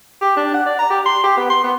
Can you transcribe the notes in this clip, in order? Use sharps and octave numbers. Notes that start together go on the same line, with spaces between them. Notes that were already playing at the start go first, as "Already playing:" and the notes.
G4
D4
F#5
D5
A#5
G4
C6
G4
B3
C6
B3